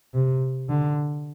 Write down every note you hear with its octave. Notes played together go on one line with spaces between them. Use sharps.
C3
D3